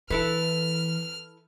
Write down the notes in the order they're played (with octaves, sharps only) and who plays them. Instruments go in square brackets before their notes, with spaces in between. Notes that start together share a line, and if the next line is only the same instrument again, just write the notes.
[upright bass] E3 [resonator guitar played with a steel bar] E4 A4 B4 [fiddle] F6